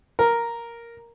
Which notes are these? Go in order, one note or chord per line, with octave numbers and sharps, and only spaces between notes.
A#4